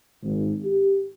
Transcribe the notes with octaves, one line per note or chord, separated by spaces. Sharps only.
G#1
G4